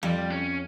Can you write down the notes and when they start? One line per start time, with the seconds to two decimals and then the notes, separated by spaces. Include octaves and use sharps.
0.03 F2 G3
0.30 C#4